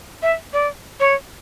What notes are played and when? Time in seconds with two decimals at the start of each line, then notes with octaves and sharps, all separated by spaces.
0.22 E5
0.53 D5
1.00 C#5